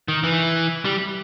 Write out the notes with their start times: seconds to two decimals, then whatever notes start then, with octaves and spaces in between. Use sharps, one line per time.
0.08 D#3
0.24 E3
0.85 G3